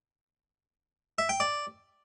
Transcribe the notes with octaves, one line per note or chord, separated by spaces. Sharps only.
E5
G5
D5